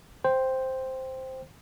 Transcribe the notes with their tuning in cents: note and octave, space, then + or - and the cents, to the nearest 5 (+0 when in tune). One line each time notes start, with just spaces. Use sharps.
C5 +0 G5 +0